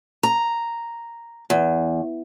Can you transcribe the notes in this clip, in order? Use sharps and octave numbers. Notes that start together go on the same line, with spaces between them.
A#5
E2